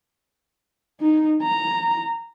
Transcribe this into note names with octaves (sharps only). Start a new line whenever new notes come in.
D#4
A#5